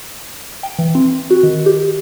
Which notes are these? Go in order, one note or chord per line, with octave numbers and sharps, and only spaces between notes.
G5
E3
C4
F#4
D#3
G4